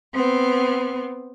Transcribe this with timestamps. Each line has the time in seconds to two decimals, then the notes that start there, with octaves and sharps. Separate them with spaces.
0.13 B3 C4